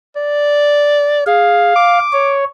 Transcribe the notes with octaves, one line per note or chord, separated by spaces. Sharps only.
D5
G#4 F5
D6
C#5